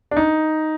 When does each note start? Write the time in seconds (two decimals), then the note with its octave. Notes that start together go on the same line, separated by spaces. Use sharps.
0.11 D4
0.17 D#4